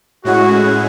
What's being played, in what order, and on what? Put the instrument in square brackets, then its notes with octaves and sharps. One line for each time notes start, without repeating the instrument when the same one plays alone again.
[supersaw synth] A2 G#3 C#4 E4 G#4 [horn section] F#4